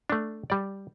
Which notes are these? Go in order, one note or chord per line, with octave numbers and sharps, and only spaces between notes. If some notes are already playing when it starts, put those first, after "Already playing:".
A3 D4
G3 D5